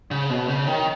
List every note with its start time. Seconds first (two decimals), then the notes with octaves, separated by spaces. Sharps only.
0.11 C#3
0.30 B2
0.48 C#3
0.67 D#3